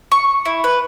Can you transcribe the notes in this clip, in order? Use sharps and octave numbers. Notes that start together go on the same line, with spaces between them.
C#6
E4
B4